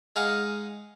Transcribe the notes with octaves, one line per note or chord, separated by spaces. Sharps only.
G#3 D#4 F5 F#5